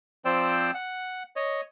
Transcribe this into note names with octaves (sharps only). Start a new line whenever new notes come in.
F3 C4 C5 D5 G5 E6
F#5
C#5 D#5